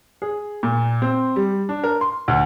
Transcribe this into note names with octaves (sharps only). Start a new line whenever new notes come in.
G#4
A#2
C4
G3
D4
A#4
C6
D2